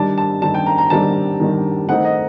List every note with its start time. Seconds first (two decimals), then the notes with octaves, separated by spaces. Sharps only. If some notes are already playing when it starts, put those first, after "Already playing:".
Already playing: D#3 G3 D4 A5
0.18 A5
0.42 D#3 G3 D4 A5
0.54 G5
0.66 A#5
0.78 A#5
0.90 D#3 G3 D4 A5
1.40 D#3 G3 D4
1.88 D#3 A3 C4 D#4 F#5
2.05 D#5